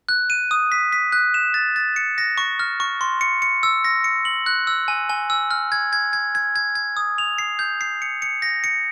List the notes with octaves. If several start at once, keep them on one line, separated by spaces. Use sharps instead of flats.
F#6
D#7
D#6
B6
B6
F#6
E7
A6
A6
C#7
A#6
C#6
F6
C#6
C6
C#7
C#7
E6
A#6
C#7
F#7
F#6
E6
G#5
G#5
E6
F6
G#6
G#6
G#6
G#6
G#6
G#6
D#6
F7
C7
G6
C7
C#7
C#7
A#6
C#7